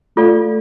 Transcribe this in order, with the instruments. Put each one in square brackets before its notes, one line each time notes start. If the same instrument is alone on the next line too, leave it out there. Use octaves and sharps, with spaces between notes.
[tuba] A3 [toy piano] F4 A4 D5 F5